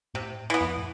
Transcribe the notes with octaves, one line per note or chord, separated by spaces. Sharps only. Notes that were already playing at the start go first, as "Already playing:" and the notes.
A2 C3
E3 B3
F2
A2